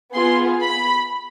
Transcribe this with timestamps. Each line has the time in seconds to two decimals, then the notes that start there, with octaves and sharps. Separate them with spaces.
0.14 B3 F4 G#4 C6
0.61 B5